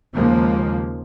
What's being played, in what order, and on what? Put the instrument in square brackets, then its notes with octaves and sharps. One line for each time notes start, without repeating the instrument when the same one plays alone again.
[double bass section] D#2 C#3 F3 G#3 A#3